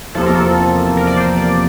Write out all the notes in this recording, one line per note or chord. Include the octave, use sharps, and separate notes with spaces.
E2 C3 F3 A#3 A4
A#4
A4
A#4
D5
C5
D5